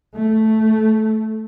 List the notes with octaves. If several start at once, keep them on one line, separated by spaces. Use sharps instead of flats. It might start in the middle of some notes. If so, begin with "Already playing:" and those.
A3